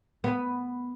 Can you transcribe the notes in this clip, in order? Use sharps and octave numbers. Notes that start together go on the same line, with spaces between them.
B3